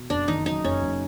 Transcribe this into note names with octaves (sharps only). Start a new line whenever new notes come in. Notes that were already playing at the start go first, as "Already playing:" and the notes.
Already playing: B2
F#1 D4
D#3 D#4
F#2 D#4
F#1 C#4
F#1